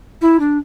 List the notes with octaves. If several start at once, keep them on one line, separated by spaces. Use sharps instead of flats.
E4
D4